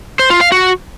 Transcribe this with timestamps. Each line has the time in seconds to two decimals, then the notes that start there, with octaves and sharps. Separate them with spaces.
0.19 C5
0.30 F4
0.41 F5
0.52 F#4